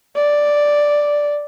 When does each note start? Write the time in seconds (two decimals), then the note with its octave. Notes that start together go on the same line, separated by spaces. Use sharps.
0.16 D5